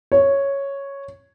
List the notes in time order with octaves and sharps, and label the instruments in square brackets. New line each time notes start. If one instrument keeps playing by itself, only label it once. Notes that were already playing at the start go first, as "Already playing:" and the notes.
[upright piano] C#5